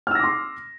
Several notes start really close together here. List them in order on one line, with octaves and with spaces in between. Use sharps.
F6 E6 A#6 D6 C6